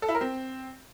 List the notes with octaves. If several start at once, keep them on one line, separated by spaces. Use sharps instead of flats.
A4
E4
A#4
C4